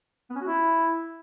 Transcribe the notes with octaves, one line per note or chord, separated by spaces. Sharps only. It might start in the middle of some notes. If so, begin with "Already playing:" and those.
B3
C#4
F#4
E4